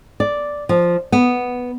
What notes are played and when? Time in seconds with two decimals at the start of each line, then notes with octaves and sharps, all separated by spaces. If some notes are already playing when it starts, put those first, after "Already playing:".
0.20 D5
0.69 F3
1.12 B3